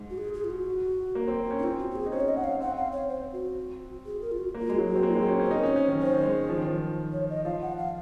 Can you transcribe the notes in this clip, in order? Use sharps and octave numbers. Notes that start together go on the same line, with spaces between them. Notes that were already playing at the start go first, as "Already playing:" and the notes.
Already playing: G#2
F#4
G#4
G#4
F4
F#4
A#3
C4
C#4
D#4
C4 F4
F#4
F#4
G#4
D#4
C#4 C5
C#5
D#5
C#4 F#5
F5
C4 F#5
F5
C#5
C5
F#4
G#4
A#4
F4
F#4
A#3
F4
G#3 F#4
F#3
F#4
C4
A#3
F#3
G#3
C4
C#4
C#4 C5
D#4 A#4
C#4 C#5
C#4 C5
D#3
D#3 C5
G#3
F3
D#3
F3
C#5
D#5
F3 F5
F#5
F5